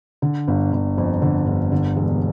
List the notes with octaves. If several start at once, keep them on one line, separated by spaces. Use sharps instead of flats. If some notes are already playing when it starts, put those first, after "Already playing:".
D3
G1
G1
F2
D3
G1
D3
E1